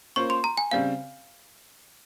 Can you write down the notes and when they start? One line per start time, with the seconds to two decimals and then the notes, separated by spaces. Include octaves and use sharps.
0.16 A#3 C#4 F4 C5 C#6
0.30 C6
0.44 A#5
0.57 G#5
0.71 C#3 G3 C4 F5